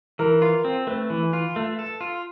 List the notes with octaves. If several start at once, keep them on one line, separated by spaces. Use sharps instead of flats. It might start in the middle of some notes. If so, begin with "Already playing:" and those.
E3 A#4
F4
C4
A3 B4
E3
F4
A3
A4
F4